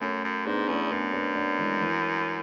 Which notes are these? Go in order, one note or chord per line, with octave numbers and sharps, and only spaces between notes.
F#2 A3 C#4
F#2
G#2 B3 D4
E2 A3 C#4
F#2 B3 D4
B3 D4
B3 D4
E3 G#3
E3